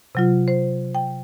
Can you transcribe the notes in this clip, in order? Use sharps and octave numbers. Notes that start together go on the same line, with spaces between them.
C3 F#3 F4
C5
G5